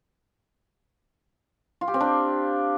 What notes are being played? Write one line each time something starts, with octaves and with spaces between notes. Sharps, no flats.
F4
G4
C4
D4